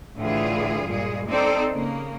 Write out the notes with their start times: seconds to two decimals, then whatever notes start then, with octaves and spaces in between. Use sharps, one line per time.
0.17 A2 D3 E3 F4 G#4
0.86 G2 A#2 G#3 G#4
1.29 C4 D#4 A4 C5 D5
1.71 C#3 A#3